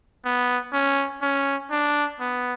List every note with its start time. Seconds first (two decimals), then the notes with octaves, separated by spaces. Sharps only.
0.25 B3
0.73 C#4
1.22 C#4
1.71 D4
2.20 B3